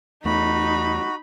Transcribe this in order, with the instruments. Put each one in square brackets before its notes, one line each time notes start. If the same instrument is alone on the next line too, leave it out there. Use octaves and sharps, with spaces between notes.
[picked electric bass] E2 A3 [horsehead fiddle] D#4 [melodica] F#4 [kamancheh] B5